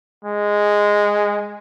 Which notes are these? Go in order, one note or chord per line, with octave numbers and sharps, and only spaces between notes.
G#3